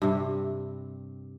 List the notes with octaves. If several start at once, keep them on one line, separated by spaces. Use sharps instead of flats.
G2 C3